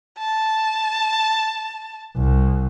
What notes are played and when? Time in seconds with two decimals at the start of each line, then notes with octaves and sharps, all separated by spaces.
0.19 A5
2.16 C2